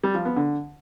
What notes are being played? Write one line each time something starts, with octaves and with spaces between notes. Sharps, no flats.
G3
F3
B3
D3